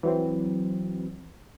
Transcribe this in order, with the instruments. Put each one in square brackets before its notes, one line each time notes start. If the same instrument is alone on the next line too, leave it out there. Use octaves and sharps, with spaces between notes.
[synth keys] E3 F#3 C4